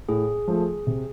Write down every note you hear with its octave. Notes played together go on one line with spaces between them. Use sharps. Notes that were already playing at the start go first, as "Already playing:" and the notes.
A2 G#4
F3 A3
C3